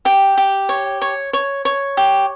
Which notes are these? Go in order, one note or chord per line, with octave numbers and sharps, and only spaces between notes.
G4 G5
G4
C#5
C#5
C#5
C#5
G4